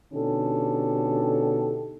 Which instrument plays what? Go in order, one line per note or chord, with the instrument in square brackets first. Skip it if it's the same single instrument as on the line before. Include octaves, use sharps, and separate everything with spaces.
[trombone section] B2 D3 C#4 D#4 G4 A4